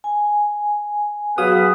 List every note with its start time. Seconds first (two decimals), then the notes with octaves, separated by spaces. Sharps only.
0.04 G#5
1.38 F#3 B3 G#4 B4 F5 D#6